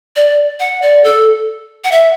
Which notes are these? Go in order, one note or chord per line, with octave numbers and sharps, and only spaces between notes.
D5
F#5
D5
A4
F#5
E5